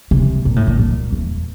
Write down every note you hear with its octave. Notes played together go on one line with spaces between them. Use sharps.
C3
A#2
A2
A#2
A#2
E2